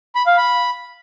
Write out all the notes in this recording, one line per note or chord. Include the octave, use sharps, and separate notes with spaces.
B5
F5
B5